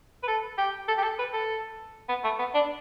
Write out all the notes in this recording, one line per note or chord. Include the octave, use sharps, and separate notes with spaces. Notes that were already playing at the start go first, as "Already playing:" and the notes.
B4
A4
G4
A4
G4
A4
B4
A4
B3
A3
B3
D4